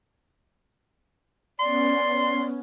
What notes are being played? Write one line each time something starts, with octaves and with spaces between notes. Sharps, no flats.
B3 C#4 D5 C6